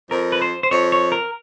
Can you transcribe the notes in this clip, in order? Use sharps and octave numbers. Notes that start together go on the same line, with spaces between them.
F2 A#4
B4
C5
C5
F2 C#5
C#5
A#4